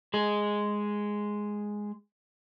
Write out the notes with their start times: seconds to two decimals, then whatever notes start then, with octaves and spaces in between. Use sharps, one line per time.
0.14 G#3 G#4